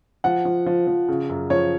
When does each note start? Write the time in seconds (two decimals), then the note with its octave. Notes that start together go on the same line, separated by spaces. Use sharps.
0.24 F3 F#5
0.45 F3
0.66 F3
0.87 F3
1.08 C#3
1.29 F#2
1.50 F3 C#5